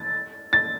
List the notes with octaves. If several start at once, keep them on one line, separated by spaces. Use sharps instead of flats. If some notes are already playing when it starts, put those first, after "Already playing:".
Already playing: A6
A6